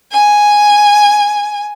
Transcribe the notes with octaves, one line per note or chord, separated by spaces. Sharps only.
G#5